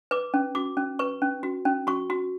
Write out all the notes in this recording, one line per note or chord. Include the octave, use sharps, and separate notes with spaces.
B4 D6
C#4
F#4 D6
C#4
B4 C#6
C#4
F#4
C#4
F#4 C#6
F#4